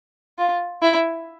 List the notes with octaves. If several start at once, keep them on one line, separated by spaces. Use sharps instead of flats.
F4
E4